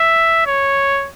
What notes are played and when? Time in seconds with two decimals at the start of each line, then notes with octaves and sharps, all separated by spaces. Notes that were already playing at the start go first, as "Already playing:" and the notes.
Already playing: E5
0.46 C#5